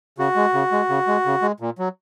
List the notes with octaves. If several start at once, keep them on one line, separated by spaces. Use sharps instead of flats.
C#3 F#4
G#3
C#3
G#3
C#3
G#3
C#3
G#3
A#2
F#3